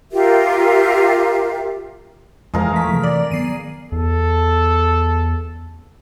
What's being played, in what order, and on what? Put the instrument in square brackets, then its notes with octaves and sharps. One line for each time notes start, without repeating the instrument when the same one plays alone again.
[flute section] F4 G4 A#4 E5
[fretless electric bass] F2 [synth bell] E3 F3 G#3 [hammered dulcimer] G#4 A#4 F5
[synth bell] A3 B6
[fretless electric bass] C3 E3
[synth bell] D5
[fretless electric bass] D#3 F#3 B3 [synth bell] C7 D#7
[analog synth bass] E2 [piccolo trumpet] A4